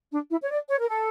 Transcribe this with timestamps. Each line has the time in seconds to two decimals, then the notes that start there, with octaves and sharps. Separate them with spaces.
0.11 D4
0.30 E4
0.41 C#5
0.50 D5
0.69 C#5
0.80 A#4
0.88 A4